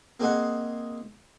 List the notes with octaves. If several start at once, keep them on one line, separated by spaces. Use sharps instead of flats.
A#3 C4 G#4 C5 D#5 F#5